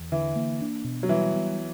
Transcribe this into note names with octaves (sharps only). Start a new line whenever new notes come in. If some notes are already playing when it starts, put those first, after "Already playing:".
Already playing: E2
D3 E3
A#3
D4
B2
F#3
E3 G3
B3